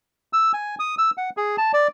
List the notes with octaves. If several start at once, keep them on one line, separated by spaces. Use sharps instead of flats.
E6
G#5
D#6
E6
F#5
G#4
A5
D5